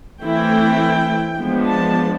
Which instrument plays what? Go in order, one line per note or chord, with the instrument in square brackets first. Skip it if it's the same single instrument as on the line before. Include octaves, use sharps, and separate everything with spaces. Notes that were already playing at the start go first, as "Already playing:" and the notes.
[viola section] E3 A3 C4 E4 G5
F3 G#3 B3 D4
A5